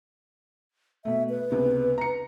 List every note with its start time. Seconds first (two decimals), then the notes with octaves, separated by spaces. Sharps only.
1.05 B2 A3 E5
1.29 B4
1.50 C#2 C3 B3
1.98 A#5 C#7